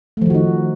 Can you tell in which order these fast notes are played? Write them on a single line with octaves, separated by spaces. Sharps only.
A3 F3 D#3 F#4 D#4